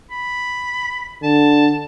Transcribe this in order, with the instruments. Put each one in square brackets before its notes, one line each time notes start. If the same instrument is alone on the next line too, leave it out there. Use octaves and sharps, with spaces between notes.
[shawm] B5
[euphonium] D3 [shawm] A5